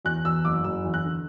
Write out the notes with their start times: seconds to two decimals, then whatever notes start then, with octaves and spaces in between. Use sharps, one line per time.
0.05 E2 F#6
0.25 E2 E6
0.45 F#1 D6
0.64 F#1 E6
0.84 E2
0.94 F#6
1.04 D3